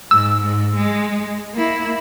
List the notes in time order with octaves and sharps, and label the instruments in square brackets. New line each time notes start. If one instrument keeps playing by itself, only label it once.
[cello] G#2 [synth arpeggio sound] E6
[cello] G#2
G#3
A#3 E4